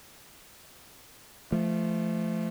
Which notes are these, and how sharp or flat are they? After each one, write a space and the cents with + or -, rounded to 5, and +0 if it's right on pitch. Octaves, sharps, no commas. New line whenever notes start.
F3 -25 A3 -10